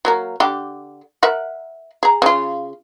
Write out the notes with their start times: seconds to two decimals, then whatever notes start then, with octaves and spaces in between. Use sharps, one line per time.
0.05 F#3 A#3 A#4
0.40 D3 G4
1.23 A#4 E5 F#5
2.03 G#4 A#5
2.22 C#3 F4